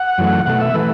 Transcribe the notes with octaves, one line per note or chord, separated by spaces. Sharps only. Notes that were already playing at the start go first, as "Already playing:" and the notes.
Already playing: F#5
F#2 E3 A3
B2 A3 F#5
E5
E3 A3 B4